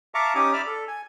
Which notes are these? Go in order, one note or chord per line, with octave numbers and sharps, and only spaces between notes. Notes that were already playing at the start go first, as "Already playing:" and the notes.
E5 F5 A5 A#5 C#6 D6
C#4 D#4 G4 G#5 D6 D#6
D5 E5 B5 D6 F6
A4
G#5